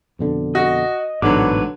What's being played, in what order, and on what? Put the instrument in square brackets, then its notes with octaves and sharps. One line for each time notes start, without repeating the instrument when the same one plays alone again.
[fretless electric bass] F2 B2 D3
[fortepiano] F#4 [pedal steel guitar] D#5
[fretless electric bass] A1 G#2 B2 [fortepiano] D3 F#3 [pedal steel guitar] B4 C#5 D6